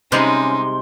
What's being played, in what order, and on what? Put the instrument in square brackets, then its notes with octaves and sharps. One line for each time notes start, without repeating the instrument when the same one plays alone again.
[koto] C3 G3 G#3 [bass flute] C#4 [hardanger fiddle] D#4 [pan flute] C6